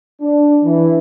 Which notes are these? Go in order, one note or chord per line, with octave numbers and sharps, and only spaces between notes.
D4
E3